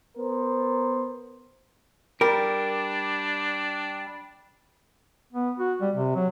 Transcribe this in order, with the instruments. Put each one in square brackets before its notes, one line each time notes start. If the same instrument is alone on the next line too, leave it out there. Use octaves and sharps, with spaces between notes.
[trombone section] B3 A#4 C5
[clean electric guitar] G3 [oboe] D4 [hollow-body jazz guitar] A#4
[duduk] B3
F#4
G3
C3
F#3